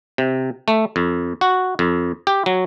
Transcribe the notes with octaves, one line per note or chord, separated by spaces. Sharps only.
C3
A3
F2
F#4
F2
G4
F#3